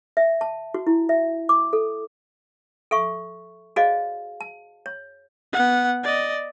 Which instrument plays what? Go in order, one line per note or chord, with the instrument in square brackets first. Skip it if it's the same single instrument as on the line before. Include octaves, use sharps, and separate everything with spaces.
[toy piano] E5
A5
F#4
E4
E5
D6
A4
A4 E5 C#6
F#4 G#4 C5 D5 D#5 F5
A5
C#5
[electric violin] B3 F#5
D5 D#5